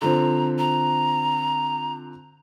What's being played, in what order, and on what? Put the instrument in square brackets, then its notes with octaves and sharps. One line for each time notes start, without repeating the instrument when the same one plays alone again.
[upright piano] D3 F3 C4 [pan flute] A#5
[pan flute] A#5